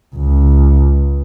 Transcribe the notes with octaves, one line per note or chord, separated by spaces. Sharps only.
C#2